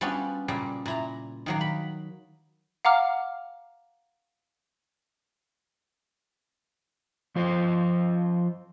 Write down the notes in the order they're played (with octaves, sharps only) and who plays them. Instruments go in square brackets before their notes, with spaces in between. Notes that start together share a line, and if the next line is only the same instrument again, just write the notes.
[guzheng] G3 B3 C#4 D4 F4 F#4
A#2 C#3 G3
A#2 E4 A#5
D#3 F#3 A#3
B5
[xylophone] F5 F#5 A#5 D6 F6
[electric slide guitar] F3 F4 C5 D#5